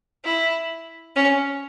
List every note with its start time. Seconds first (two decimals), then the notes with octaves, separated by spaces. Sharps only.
0.24 E4
1.16 C#4